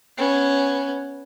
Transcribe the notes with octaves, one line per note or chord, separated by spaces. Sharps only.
B3 C#4